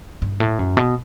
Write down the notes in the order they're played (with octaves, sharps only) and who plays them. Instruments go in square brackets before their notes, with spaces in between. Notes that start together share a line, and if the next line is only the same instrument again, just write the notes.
[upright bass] G2
A2
F#2
B2